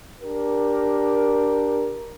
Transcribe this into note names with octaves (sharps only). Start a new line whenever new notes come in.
D4 G4 A#4